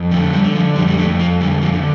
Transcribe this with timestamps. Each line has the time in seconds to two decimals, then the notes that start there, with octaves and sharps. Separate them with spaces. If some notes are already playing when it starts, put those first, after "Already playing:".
Already playing: F2
0.11 D3 F3 A3
0.33 G3
0.44 D3
0.54 F3
0.76 F2 G3
0.88 G3
0.97 F3 A3
1.08 F2
1.19 F3
1.40 D3 G3
1.62 F3
1.73 D3